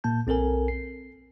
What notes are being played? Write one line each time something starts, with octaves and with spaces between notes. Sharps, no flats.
A#2 A#3 A5 G6
B1 C4 A4 A#4 G#5
C7